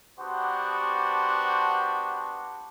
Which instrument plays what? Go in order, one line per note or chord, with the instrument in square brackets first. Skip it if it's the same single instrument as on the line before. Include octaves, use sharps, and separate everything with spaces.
[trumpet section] B3 D4 F#4 G4 C5